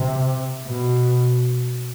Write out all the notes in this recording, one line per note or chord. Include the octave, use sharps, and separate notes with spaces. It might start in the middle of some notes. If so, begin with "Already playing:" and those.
Already playing: C3
B2